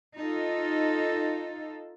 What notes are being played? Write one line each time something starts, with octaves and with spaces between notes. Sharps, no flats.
D#4 F4 A4